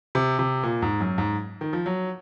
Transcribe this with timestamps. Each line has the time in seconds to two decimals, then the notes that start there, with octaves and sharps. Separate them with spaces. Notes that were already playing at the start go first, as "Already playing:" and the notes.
0.15 C3
0.39 C3
0.63 A#2
0.82 G#2
1.00 F#2
1.18 G#2
1.61 D#3
1.73 F3
1.86 F#3